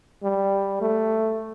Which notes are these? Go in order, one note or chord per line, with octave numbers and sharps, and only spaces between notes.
G3
A3